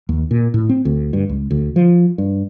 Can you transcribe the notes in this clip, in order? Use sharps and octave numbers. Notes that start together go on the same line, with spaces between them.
D#2
A#2
A2
C4
D2
G2
C#2
D2
F3
G2